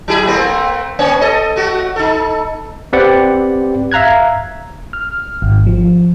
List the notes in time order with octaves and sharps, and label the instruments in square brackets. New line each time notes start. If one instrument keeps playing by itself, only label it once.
[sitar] F#3 E4 G#4
A3 A#3 C4
A#3 C#4 C#5
A4 D#5
A3 F#4
D#4 A4
[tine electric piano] C4 G4 B4 D5 F#5
E5 F5 A#5 F#6 G#6
[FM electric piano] F6
G#1
F3